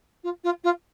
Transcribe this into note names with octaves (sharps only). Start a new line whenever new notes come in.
F4
F4
F4